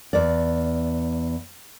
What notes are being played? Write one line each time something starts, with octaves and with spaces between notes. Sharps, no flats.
E2 D5